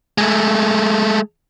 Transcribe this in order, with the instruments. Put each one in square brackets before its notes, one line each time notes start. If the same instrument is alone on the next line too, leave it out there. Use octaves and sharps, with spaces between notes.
[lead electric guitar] G#3 A3